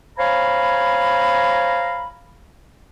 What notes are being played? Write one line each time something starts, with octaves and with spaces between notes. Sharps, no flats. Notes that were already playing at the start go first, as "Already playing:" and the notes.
C5 C#5 F5 G#5 A#5 B5